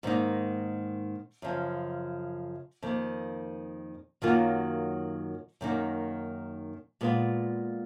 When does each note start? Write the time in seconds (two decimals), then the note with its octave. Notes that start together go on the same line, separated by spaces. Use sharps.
0.03 G#2 D#3 A#3 D#4
1.42 F#2 C#3 F3
2.82 F2 D#3 A#3
4.22 F#2 D#3 F#3 A#3 F4
5.61 F#2 D#3 A#3 D#4
7.01 A#2 G#3 B3 F4